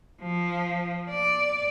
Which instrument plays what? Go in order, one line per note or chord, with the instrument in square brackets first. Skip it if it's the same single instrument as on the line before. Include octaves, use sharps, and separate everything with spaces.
[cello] F3
D5